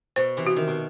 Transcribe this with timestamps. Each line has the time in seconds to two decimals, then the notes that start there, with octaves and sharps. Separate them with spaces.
0.16 B2 C5
0.37 C3 E3
0.47 F#4
0.56 D#3
0.68 B2